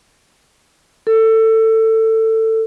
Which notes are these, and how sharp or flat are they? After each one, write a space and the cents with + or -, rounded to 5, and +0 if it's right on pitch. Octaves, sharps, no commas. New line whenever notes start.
A4 +20